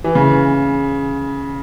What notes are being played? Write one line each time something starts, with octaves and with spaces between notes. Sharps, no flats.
E3
C#3